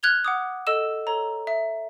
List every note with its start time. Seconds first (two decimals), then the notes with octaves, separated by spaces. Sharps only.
0.03 F6 F#6 G#6 F7 G7
0.25 F#5 D6 D#6
0.67 A4 D#5 E6 E7
1.07 A4 C#5 A#5
1.47 E5